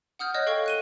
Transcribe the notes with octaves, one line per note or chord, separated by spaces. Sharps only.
F#5 D#6 F6 G6
C#5 D#5 F#6 G6
A4 F5 G5 C#6 G#6
F#6 D#7 G7